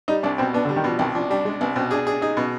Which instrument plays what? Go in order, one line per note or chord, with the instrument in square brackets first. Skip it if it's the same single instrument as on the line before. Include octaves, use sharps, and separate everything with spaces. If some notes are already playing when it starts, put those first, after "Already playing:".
[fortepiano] G3 [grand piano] D#4
[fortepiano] C2 [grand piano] D4
[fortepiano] B2 [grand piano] C4
[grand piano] B3 [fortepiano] D4
[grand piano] D3
[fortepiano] G3
[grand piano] D#3
[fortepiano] B2 [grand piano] F3
[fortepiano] C2 [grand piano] D#3
[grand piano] F3 [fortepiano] D4
[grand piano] G3 [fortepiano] D4
[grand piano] G#3 [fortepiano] D4
[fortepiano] C2 [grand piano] B3
[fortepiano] B2 [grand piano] C4
[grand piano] D4 [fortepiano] G#4
[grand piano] D4 [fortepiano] G#4
[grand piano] D#4 [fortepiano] G#4
[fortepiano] B2